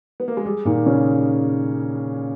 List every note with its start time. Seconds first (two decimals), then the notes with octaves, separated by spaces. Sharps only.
0.20 B3
0.28 A#3
0.37 G#3
0.45 G3 G#4
0.65 A#2 D#3
0.86 C#3 C#4